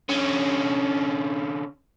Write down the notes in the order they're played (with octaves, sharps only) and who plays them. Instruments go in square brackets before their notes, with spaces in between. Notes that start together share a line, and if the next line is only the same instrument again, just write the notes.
[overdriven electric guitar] D3 C#4